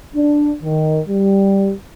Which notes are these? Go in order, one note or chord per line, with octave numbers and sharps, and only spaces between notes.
D4
D#3
G3